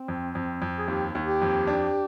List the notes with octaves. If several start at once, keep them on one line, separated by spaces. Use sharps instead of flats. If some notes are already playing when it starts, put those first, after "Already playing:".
Already playing: C4
F2
F2
F2
G#4
D#2 G4
D#2
G4
F2
D4